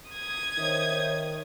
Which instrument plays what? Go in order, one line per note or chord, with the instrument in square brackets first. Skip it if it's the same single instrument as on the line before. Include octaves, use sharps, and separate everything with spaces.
[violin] D#6 G#6
[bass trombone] D#3 [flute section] C5 C#5 E5